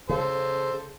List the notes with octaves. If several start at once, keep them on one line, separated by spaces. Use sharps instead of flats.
C#3 A4 C5